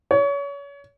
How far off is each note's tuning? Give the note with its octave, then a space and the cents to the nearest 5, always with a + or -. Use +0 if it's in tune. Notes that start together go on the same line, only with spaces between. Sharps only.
C#5 +30